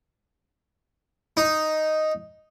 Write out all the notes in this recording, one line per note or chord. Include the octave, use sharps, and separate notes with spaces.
D#4